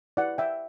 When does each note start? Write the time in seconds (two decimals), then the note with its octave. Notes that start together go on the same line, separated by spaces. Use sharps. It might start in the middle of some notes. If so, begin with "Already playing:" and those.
0.17 E4 G4 B4 D5 F#5
0.38 E5 G5